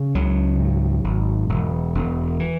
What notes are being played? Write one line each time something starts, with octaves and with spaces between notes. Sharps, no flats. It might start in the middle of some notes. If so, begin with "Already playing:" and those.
Already playing: C#3
C#2 F#3
G#2
G#1
E1
E1
E3